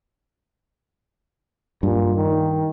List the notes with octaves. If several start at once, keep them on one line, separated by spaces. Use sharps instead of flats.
G2 A#2
D#3